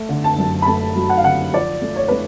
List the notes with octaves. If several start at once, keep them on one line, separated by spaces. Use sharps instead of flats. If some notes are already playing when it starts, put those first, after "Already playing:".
Already playing: A3
D3
A5
F#2
B5
A3 A5
F#3
F#5
F5
D3 F#5
F3 D5
A3
C#5
A3 B4